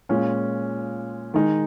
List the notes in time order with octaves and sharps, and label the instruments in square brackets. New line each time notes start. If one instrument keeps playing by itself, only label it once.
[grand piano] A#2 G#3 C#4 F4
D#3 G#3 D#4